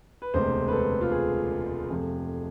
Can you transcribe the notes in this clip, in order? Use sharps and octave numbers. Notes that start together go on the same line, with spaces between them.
B4
E1 D2 C3 G#3 C5
B4
A4
F4
G#4
F2 C3 F3 A3